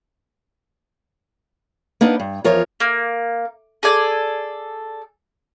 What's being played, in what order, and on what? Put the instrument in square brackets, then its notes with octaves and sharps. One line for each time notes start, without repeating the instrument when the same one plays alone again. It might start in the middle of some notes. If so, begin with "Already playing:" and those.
[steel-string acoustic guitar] A#3 B3 D4 D#4
G2
E2 F3 F4 A#4 C#5
[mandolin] A#3
G#4 A4 D5 G#5